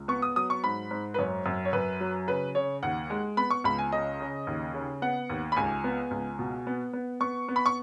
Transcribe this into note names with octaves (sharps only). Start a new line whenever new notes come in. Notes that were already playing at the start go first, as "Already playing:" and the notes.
Already playing: C#2
B3 C#6
D#6
F#3 D#6
C#6
G#2 B5
G#2
B4
F#2 C#5
F#2
C#5
F#2 B4
F#3
C#3 B4
C#3 C#5
D#2 F#5
G#3
B3 B5
C#6
C#2 B5
G#5
C#3 D#5
C#3
D#2
C#3
B3 F#5
D#2
B5
C#2 G#5
B3
C#2
B2
B3
B3
B3 C#6
B3
B5
C#6